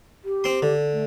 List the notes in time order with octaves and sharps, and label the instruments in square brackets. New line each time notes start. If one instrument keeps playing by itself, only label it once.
[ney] G4
[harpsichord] C4 C6
D3
[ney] A3